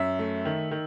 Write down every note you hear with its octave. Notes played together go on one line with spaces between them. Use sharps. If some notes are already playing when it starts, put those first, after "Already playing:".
Already playing: F#2 E5
A3
D#3
D#3